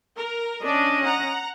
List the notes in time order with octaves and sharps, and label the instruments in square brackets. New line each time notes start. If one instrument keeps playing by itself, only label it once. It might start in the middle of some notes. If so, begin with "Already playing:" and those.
[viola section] A#4
[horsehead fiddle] C#4 D#5 [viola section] D4
[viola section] F#5 A#5